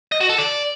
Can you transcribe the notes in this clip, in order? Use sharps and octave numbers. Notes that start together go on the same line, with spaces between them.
D#5
F#4
A4
D5